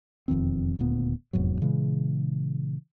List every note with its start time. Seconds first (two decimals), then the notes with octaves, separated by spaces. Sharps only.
0.28 E1 F2 D#3 C4
0.79 D#1 D2 A#2 B3
1.33 F1 E2 G#2 F#3
1.61 A#2 C#3 E3 G#3